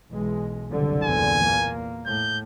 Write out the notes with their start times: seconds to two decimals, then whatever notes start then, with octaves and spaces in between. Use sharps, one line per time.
0.11 B1 E3 G#3
0.71 F#1 C2 D3
1.04 E2 A#2 G#5
1.44 A#3
2.06 A2 G6